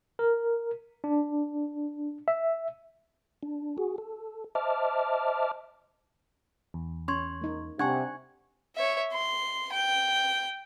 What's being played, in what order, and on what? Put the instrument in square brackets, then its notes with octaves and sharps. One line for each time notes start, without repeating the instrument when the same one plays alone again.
[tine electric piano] A#4
D4
E5
[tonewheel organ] D4
F#4 G#4
A4
C5 D#5 E5 A5 D6 F6
[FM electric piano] E2
[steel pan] C#4 [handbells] C6 C#6 G#6
[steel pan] A#3 D#4
[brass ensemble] C3 [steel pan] D4 [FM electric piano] F#5 [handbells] G#5 C#6 G#6
[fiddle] C#5 E5
C6
G5